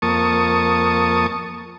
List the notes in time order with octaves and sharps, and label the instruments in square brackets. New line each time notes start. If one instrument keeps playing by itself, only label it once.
[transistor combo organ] F2 A#3 A5 C#6 D#6